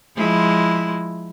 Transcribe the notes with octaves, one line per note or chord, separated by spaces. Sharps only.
F3 G#3 E4